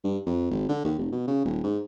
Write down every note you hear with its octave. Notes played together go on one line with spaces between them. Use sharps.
G2
F2
G#1
D3
D#2
F1
B2
C#3
D#1
G#2